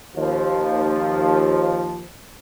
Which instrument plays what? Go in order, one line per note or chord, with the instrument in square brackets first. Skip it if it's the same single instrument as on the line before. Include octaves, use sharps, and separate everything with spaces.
[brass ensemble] D#2 F3